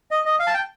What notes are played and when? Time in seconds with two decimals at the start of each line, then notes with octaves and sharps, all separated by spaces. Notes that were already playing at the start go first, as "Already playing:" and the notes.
0.11 D#5
0.26 D#5
0.39 F5
0.47 A5
0.54 G5